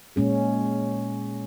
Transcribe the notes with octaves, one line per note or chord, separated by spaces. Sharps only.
A#2 G#3 C#4 G#4